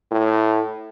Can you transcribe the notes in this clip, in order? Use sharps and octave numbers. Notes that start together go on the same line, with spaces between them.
A2